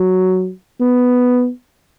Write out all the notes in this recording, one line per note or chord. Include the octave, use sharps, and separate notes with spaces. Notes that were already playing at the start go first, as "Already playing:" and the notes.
Already playing: F#3
B3